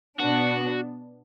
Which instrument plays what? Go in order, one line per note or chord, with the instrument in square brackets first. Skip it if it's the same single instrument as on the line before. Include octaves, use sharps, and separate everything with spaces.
[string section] B2 B3 D4 [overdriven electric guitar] F#4